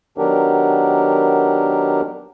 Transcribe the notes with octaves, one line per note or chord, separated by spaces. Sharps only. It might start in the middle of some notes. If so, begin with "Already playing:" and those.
D#3 F#3 B3 D4 G4 A#4